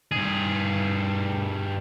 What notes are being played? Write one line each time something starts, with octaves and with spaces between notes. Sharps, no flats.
G2 G#4